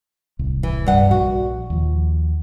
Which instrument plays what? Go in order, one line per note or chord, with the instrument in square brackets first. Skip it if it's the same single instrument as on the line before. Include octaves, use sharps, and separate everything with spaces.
[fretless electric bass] D1 C2
[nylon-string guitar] E3
G2 F#5
[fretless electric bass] A#1 [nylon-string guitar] F#4
[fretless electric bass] D#2 F3